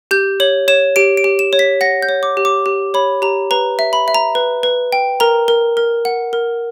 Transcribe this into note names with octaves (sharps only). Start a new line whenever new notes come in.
G4 G6
C#5 F#7
C#5 E7
G4 D7
D7
G4
E7
C#5
B6
F#5 A#6
G6
C#5
D6
G4
D6
G4
C#5 B5
G4 A#5
B4 A#5
E5
B5
E5
A#5
B4
B4
G5
A#4 A#5
A#4
A#4
F#5
A#4